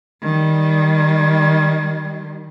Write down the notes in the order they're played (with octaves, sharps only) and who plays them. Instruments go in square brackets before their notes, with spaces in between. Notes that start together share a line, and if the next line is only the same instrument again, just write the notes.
[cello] D#3 G3